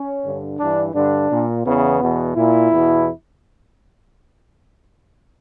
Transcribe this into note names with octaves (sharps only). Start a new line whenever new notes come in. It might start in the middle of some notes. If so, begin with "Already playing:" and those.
Already playing: C#4
G2 D3
G2 E3 D4
G2 D3 D4
A#2
E2 C#3 E3 B3
E2 B2
A#2 E4
E2 B2